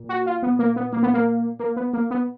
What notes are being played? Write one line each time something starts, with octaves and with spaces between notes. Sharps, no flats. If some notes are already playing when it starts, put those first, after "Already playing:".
Already playing: A#2
F#4
F4
B3
A#3
B3
A#3
B3
A#3
A#3
B3
A#3
B3